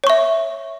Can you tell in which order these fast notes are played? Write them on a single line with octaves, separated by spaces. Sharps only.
C#5 C#6 E5